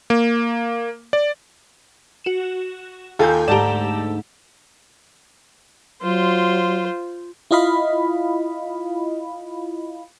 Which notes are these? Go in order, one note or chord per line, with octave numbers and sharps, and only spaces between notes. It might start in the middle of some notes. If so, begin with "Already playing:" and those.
A#3
D5
F#4 E7
D#2 F4 A4 G5 G#5 A#5 G6
D2 G#2 G4 D5 A5 A#5 E7
F#3 F4 C5
E4 F4 D#5 F5 B5